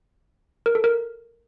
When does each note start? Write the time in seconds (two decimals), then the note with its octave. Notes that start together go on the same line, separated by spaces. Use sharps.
0.66 A#4
0.75 A4
0.84 A#4